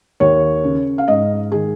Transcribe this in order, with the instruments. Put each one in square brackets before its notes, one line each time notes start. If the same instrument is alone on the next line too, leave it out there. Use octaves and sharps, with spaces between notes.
[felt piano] D#2 C#5
C#3
F5
G#2 D#5
D#3 G#4